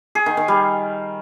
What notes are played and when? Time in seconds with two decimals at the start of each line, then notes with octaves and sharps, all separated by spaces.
0.15 G#4
0.26 D#3
0.37 D#3
0.48 G3